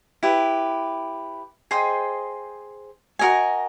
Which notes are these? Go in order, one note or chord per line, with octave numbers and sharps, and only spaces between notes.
E4 G4 B4
G#4 C5 D#5 G5
F#4 A#4 D#5 G#5